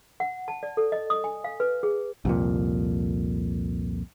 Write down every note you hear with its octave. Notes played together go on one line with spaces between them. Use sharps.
F#5
A5
D5
A4
D#5
D#6
G#5
F5
B4
G#4
C2 F2 A#2